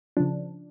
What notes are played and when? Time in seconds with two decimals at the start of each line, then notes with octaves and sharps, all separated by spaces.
0.17 C#3 F3 D4